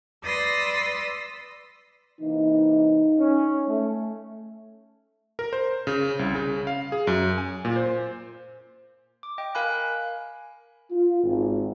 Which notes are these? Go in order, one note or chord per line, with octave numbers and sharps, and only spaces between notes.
B4 D5 C6 D#6 E6 A#6
C3 E3 A#3 D#4
C#4
A3
A#4
C5
C#3
C2
C#3
F5
G#4
F#2
G#5
A#2
C5
D6
D#5 G5 D7
A#4 F5 G#5 B5 F#6
F4
G#1